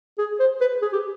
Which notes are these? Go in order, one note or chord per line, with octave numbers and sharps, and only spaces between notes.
G#4
C5
B4
G#4
G4